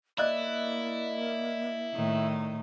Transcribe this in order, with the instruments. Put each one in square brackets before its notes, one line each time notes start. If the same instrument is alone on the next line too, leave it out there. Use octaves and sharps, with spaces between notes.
[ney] A#3 [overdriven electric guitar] E4 [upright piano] D5 D#5 F#6
[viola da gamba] A2 D#3